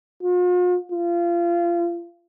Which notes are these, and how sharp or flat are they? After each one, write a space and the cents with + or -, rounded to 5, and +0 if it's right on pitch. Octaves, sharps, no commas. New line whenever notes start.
F4 +45
F4 -25